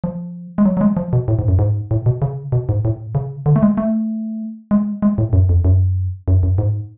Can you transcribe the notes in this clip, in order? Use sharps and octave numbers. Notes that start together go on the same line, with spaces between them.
F3
G#3
F#3
F#3
G#3
F3
B2
A2
G#2
F#2
G#2
A2
B2
C#3
B2
G#2
A2
C#3
D3
A3
G#3
A3
G#3
G#3
A2
F#2
F2
F#2
F#2
F#2
G#2